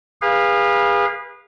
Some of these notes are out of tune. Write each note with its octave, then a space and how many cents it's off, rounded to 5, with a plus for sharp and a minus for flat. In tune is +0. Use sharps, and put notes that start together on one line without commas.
G#4 -35 B4 -20 F5 +0